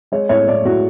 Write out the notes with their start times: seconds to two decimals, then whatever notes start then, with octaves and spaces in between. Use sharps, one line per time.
0.12 G#3 C#5
0.29 A2 C#5
0.47 A2 D5
0.65 A2 F#4